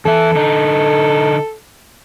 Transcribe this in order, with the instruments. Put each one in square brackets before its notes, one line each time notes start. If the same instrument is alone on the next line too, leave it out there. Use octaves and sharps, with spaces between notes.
[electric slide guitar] E2 E3 E5 [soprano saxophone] A4
[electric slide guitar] D3 D#4